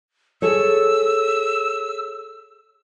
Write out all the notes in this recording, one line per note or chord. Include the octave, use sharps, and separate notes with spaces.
G#4 A4 C#5 E6